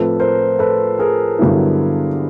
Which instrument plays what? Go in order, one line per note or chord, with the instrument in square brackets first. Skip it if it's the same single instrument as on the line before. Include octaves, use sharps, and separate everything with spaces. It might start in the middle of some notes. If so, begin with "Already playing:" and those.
Already playing: [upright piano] A2 F3 A3 C4 [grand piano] A4 B4
[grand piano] A#4 C5
A4 B4
G#4 A#4
[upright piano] G2 D3 F#3 B3 E4